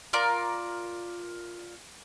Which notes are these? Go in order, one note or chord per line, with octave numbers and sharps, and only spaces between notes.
F4 A#4 D5 D6